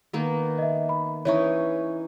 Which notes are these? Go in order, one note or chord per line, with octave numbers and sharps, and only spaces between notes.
D#3 A#3 B3
D#5 E5
B5
E3 C#4 D#4 C#5 E5 C#6